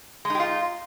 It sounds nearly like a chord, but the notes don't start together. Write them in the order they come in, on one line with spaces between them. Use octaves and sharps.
G#3 D#4 G4 F4